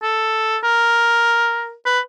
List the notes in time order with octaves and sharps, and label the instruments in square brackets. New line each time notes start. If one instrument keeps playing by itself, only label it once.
[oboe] A4
A#4
B4